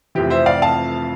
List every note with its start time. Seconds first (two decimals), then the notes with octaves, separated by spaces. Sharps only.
0.15 F1 F2 E3 G4
0.30 C5 E5
0.46 D5 F5
0.62 F5 A5